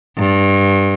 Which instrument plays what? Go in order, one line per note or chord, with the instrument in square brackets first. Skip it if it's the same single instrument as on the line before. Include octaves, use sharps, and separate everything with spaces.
[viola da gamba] G2